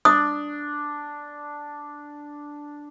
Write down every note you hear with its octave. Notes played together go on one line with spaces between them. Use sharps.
D4 D#6